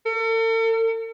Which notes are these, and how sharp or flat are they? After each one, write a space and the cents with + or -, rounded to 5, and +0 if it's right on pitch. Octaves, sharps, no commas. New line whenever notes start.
A4 +45